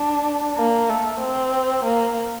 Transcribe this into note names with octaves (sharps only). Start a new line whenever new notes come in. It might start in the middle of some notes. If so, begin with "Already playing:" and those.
Already playing: D4
A#3
A3
C4
A#3